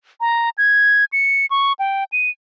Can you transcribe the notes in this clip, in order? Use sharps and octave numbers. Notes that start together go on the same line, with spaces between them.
A#5
G#6
C#7
C#6
G5
D#7